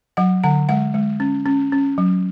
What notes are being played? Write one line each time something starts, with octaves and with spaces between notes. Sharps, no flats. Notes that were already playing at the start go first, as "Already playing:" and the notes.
F#3 F#5
D3 F#5
G#3 F#5
G#3
C#4
C#4
C#4
F#3